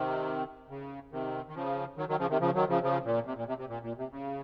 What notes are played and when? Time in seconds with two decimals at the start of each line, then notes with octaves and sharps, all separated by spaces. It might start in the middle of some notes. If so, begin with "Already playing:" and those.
Already playing: C3 D#3
0.70 C#3
1.12 C3 D#3
1.48 D#3
1.55 C#3 F3
1.97 D#3 F#3
2.09 D#3 F#3
2.19 C#3 F3
2.30 C3 D#3
2.41 C#3 F3
2.55 D#3 F#3
2.69 C#3 F3
2.83 C#3 F3
3.05 A#2
3.26 C3
3.37 A#2
3.47 C3
3.58 C3
3.69 A#2
3.83 A#2
3.97 C3
4.11 C#3